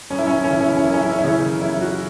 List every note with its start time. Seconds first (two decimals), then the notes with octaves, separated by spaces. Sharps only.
0.10 F#2 C#4
0.19 E4
0.27 C#4
0.36 E4
0.44 C#4
0.49 C#3 E3 E4
0.61 C#4
0.69 E4
0.77 C#4
0.86 F#2 E4
0.94 C#4
1.02 E4
1.11 C#4
1.19 E4
1.24 C#3 E3 C#4
1.61 F#2 E4
1.81 F#4